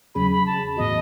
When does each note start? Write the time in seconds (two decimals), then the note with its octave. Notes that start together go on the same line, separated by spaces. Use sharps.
0.15 E2 C#3 F#3 C#4 G#4 B5
0.31 B5
0.46 A5
0.77 A2 E3 B3 F#4 D#5